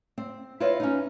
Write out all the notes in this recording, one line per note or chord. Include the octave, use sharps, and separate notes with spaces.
C4
E4 F4 B4 C#5 D#5 F5
C#4 D#4